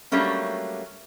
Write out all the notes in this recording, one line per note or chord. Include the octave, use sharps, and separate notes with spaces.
F#3 G3 A3 A#3 C#4 D4